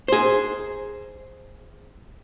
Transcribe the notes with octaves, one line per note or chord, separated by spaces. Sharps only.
G#4 C5